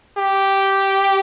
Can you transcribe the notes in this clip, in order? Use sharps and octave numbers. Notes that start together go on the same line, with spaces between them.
G4